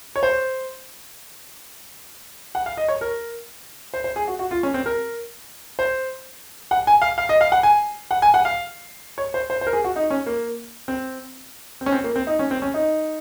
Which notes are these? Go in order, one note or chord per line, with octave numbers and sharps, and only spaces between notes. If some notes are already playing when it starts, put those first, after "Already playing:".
C#5
C5
F#5
F5
D#5
C#5
A#4
C5
C5
G#4
F#4
F#4
F4
C#4
C4
A#4
C5
F#5
G#5
F5
F5
D#5
F5
F#5
G#5
F#5
G#5
F#5
F5
C#5
C5
C5
C5
A#4
G#4
F#4
D#4
C#4
A#3
C4
C4
C#4
C4
A#3
C4
D#4
C#4
C4
C#4
D#4